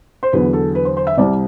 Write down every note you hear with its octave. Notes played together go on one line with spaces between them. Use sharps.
C5
E2 D3 F#3 B4
A4
B4
C5
C5
E5
C2 C3 G3 D5